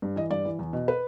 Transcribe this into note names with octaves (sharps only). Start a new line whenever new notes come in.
G2
E3 D#5
G2 D5
E3
E2
B2
B4